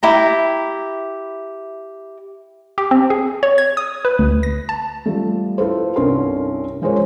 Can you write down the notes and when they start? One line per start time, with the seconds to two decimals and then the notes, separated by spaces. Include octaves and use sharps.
0.03 E4 G4 A#5
2.78 G4
2.91 C4
3.10 G#4
3.43 C#5
3.58 G#6
3.77 D#6
4.05 B4
4.19 D2
4.43 A#6
4.69 A5
5.06 F3 G3 A3
5.58 E4 F4 A4 B4 C5
5.96 C2 G2 C#4 A#4 C6
6.82 F3 G#3 A#4 C5 C#5